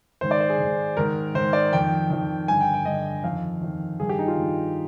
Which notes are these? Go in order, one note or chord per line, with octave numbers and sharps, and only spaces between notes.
G#2 D#3 C5
D5
C5
G#4
G#2 D#3
G#2 D#3 A#4
G#2 D#3 C5
D5
F2 D#3 G5
F2 D#3
G2 D3 G#5
G5
G5
G2 D3 D#5
F2 D#3 F5
F2 D#3
G2 D#3 G#4
G4
D#4
F4
G2 D#3